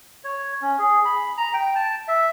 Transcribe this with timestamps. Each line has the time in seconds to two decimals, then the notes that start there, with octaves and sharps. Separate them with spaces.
0.24 C#5
0.62 C#4
0.79 G#4
1.05 B5
1.38 A#5
1.54 G5
1.75 A5
2.08 E5